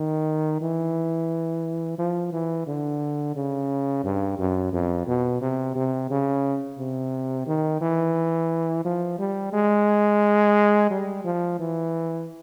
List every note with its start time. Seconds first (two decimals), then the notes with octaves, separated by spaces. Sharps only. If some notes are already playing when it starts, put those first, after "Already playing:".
Already playing: D#3
0.61 E3
1.98 F3
2.33 E3
2.67 D3
3.36 C#3
4.04 G2
4.39 F#2
4.73 F2
5.07 B2
5.41 C3
5.76 C3
6.10 C#3
6.79 C3
7.47 D#3
7.81 E3
8.85 F3
9.19 G3
9.53 G#3
10.90 G3
11.25 F3
11.59 E3